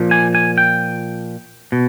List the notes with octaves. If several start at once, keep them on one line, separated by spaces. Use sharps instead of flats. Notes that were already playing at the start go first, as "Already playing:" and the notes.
Already playing: A#2 F3
G#5
G#5
G5
B2